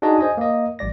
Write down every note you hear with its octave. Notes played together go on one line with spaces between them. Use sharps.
D4 D#4 F#4 G#4 D#5
C5 D#5 G#5
A#3 D#5
A1 G3 D5 A#6